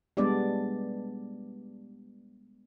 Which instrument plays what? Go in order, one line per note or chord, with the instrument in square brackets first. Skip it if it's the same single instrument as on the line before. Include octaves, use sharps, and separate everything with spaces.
[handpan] G3 G#3 B3 D4 D5